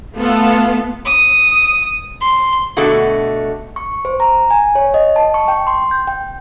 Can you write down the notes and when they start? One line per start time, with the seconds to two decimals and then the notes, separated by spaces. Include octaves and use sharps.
0.15 A3 B3 F4 A4
1.05 D#6
2.21 C6
2.77 B2 D3 A3 F#4
3.76 C#6
4.05 C5
4.20 A#5
4.51 G#5
4.75 C#5
4.94 D#5
5.16 A5
5.34 C#6
5.48 G5
5.67 C6
5.91 G6
6.07 G5